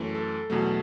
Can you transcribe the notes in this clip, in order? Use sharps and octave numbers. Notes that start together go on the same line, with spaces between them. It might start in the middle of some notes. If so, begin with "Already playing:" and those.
Already playing: F#2 E3 A3
A4
E2 B2 F#3 A3